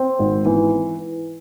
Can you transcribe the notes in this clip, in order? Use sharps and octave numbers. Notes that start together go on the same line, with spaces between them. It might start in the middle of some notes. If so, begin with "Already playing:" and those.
Already playing: C4
G#1
E3